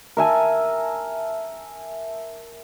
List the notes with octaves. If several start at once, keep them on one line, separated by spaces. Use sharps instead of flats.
A#4 E5 G#5 A5